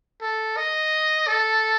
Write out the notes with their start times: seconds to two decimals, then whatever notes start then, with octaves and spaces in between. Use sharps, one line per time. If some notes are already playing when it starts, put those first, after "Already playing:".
0.22 A4
0.57 D#5
1.27 A4